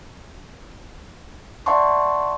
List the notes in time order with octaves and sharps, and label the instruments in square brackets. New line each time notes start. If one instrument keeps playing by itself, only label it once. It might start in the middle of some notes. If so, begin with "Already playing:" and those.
[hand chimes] D5 E5 F#5 A5 C6 C#6